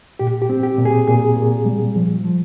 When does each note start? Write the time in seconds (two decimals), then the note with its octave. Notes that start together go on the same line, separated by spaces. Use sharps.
0.19 A#2 G4
0.42 G4
0.49 C4
0.63 G4
0.78 A#2
0.85 G#4
1.07 A#2 G#4
1.36 A#2
1.65 G3
1.96 F3
2.25 F3